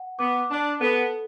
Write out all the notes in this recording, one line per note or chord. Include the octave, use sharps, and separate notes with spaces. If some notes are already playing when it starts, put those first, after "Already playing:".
Already playing: F#5
B3 D6
D4 A5
B3 A4